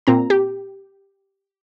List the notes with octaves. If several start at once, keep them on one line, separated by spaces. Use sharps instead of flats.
A#2 C4 A#5
G4